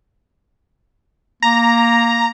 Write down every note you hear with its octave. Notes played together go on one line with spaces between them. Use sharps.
A#3 A#5